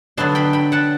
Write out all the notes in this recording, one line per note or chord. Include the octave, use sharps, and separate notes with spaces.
D3 F#3 B3 D4 A5 C6
G5 B5
G5 B5
F#5 A5